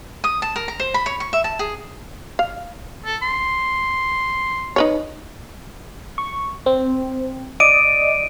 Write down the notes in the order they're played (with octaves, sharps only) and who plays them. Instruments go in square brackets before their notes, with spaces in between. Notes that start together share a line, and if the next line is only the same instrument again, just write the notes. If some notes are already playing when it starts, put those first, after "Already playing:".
[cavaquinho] D#6
A5
A#4
A#5
C5
B5
C#5
C#6
E5
A5
G#4
[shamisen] F5
[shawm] A4
C6
[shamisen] D#4 B4 C#5
[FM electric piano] C#6
C4
[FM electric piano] D5 D#5 [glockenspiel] D7 D#7